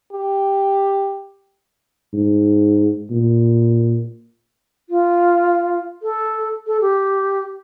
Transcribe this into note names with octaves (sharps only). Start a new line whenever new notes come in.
G4
G#2
A#2
F4
A4
A4
G4